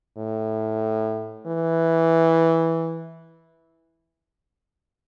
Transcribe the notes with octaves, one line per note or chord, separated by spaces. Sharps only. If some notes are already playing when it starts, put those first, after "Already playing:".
A2
E3